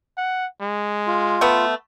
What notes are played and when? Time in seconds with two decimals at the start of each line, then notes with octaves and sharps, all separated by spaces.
0.18 F#5
0.61 G#3
1.07 F4
1.41 A3 B3